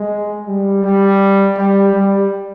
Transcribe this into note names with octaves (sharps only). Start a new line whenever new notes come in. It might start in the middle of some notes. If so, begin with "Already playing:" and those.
Already playing: G#3
G3
G3
G3
G3